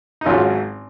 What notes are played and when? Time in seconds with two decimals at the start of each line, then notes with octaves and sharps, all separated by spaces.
0.21 D#4
0.25 G#1 G#2 F#3 C#4 F4